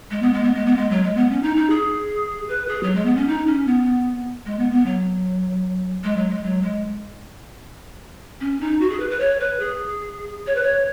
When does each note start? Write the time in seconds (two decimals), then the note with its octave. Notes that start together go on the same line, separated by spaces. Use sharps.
0.11 G#3
0.22 B3
0.33 G#3
0.44 B3
0.54 G#3
0.66 B3
0.77 G#3
0.91 F#3
1.03 G#3
1.17 B3
1.30 C#4
1.43 D#4
1.56 D#4
1.70 G#4
2.49 B4
2.68 G#4
2.83 F#3
2.95 G#3
3.05 B3
3.16 C#4
3.28 D#4
3.47 C#4
3.67 B3
4.46 G#3
4.59 B3
4.72 B3
4.86 F#3
6.04 G#3
6.17 F#3
6.30 G#3
6.44 F#3
6.63 G#3
8.41 C#4
8.61 D#4
8.80 F#4
8.90 G#4
9.00 B4
9.10 B4
9.20 C#5
9.40 B4
9.59 G#4
10.47 C#5
10.55 B4
10.63 C#5